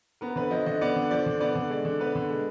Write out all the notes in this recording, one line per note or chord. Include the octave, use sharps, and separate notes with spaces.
B3 A#4
D3 B4
F3 D#5
D3 D#5
B3 D5
D3
F3 D5
D3
B3 D5
D3
G#3 D5
D3
B3 B4
D3
G#3